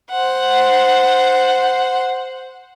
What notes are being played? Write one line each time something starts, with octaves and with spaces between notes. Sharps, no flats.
C5 F#5